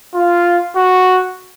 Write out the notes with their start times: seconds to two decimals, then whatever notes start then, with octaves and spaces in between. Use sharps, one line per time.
0.14 F4
0.76 F#4